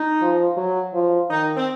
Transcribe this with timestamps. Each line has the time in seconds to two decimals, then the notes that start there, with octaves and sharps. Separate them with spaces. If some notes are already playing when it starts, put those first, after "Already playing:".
Already playing: D#4
0.21 F3
0.57 F#3
0.94 F3
1.30 D#3 D#4
1.56 C4